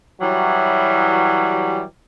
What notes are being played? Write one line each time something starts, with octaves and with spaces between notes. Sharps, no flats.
E3 F#3 G3